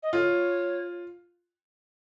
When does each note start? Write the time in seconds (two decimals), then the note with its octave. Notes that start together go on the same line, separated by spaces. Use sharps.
0.03 D#5
0.13 F4 C#5